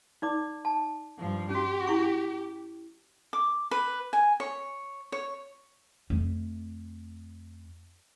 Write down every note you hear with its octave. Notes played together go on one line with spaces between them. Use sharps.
D#4 D5 D6
A5
G2 F3
C#4 F#4 G4
E4 C#6
D6
B4
G#5
C#5
C#5
F2 A3